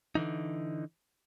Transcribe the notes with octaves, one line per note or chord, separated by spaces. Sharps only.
D3 E3 D#4